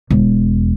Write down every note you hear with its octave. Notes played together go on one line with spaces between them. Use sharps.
E1